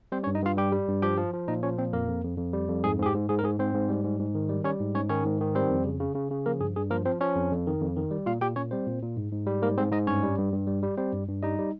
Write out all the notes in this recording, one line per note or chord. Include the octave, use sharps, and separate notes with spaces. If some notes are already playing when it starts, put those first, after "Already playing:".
G3 C4 C5
C#4 C#5
G2
D#4 D#5
G2 F4 F5
G3 G4 G5
G3
G2
F3 G4 G5
F3
F3
A#2 D#4 D#5
F3 C#4 C#5
A#2 C4 C5
F2 A#3 A#4
F2
F2
F2
G3
F2
G#2 G#4
G#2 G#4
G4
G#2
G#2 G#4
A#4
G#2 G#4
G#2 C4 C5
G#2
G3
G#2
G#2
D#3
G3
G3 C#4 C#5
G#2
G#2 C#4 C#5
D#3 C#4 C#5
G#2
D#3
G3 C4 C5
F2
C#3
C#3
C#3
C#3
F3 A#3 A#4
G2 G#4
G2 G#4
F3 A#3 A#4
F3 C4 C5
F3 C#4 C#5
F2
F2
D#3
F2
D#3
G3
A#2 F4 F5
A#2 G4 G5
A#2 C#4 C#5
G3 C4 C5
A#2
A#2
G#2
G#2
G3
G#2 A#3 A#4
G#2 C4 C5
G#2 D#4 D#5
G2 C#4 C#5
G3
G2
G2
G3
G3
G3 C4 C5
G2
G2
G3 D#4 D#5
G3